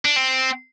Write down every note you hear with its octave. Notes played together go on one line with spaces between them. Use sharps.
D4
C4